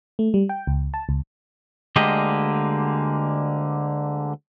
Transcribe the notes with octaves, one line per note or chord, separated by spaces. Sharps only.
A3
G3
G5
C#2
A5
C#2
D2 D3 G#3 A#3 G4 D#5